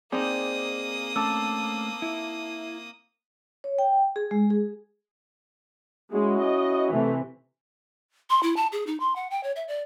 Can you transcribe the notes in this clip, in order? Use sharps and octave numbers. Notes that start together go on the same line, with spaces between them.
A#3 C4 D#4 G#4 D5 D#6
A3 C#4 A5 D6 E6
E4
C#5
G5
G#4
G#3
G#4
G#3 C#4 E4 F#4
D#5
C3 E3 A3
C6
E4
A5
G#4
D#4
C6
F#5
G5
C#5
E5
D5